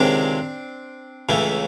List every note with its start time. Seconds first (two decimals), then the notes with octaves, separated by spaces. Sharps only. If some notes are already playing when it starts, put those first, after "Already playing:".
Already playing: C#2 C3 D#3 G#3 C4 D4
1.29 C#2 C#3 E3 A3